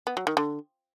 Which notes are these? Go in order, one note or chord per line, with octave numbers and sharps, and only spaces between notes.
B3
F#3
D#3
D3